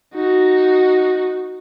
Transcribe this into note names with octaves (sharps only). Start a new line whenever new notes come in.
D#4 F#4